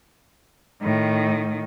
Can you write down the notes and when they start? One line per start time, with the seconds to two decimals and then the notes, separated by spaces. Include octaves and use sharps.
0.82 A2 D#3